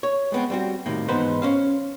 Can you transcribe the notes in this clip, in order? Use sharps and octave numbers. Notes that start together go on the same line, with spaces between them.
C#5
G#3 B3 C4
G3 C4 F#4
A2 C3 D#3 A#3
E2 G#2 B3 D#4 B4 C5
C#4 C5 F5